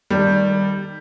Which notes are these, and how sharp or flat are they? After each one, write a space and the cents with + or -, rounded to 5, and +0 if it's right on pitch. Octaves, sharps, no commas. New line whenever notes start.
D#3 +0 G3 +0 A4 +35